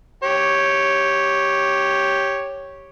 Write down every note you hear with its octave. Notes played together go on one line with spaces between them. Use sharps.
G4 C#5